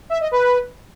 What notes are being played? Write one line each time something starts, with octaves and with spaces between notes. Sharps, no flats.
E5
D#5
B4